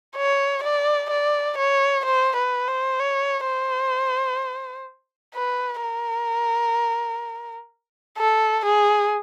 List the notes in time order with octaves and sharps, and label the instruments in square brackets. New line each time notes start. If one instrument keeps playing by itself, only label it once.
[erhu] C#5
D5
D5
C#5
C5
B4
C5
C#5
C5
B4
A#4
A4
G#4